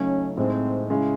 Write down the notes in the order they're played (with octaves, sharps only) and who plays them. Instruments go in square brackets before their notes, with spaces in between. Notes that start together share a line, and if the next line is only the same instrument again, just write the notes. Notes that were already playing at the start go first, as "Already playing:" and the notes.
Already playing: [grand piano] C#3 F#3 A3 D#4 [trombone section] C#4
[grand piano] A2 G#3 D#4 [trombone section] C4
[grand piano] C#3 G#3 C#4 E4